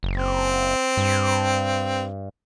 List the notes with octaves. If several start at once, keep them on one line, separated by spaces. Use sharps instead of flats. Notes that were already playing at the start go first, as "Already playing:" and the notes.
F#1
C4
G2